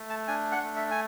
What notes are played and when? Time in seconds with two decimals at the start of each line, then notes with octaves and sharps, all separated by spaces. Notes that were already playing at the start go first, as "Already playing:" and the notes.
Already playing: A3
0.10 A5
0.28 D4 G#5
0.52 F#5
0.64 A3
0.76 E5
0.91 G#5